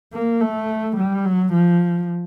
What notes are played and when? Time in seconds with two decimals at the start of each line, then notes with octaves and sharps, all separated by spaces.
0.13 A#3
0.41 A3
0.97 G3
1.25 F#3
1.53 F3